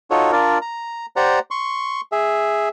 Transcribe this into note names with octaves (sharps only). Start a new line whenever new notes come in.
D#4 F4 F#4 A4 C#5
D4 F4 A#4 D5
A#5
G4 C5 D5 F#5 A#5
C6 C#6
G#4 E5